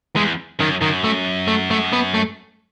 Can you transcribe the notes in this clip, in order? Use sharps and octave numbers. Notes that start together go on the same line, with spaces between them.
E2 G#3
F#2 D#3
F#2 D#3
A3
A3
A3
B3
A3